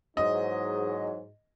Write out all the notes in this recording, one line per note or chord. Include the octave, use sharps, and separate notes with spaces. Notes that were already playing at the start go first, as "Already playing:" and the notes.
E2 G#2 F#3 D#4 D#5